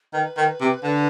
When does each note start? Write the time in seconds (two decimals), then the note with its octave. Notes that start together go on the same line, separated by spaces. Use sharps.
0.13 D#3 B4
0.37 D#3
0.60 C3
0.83 D3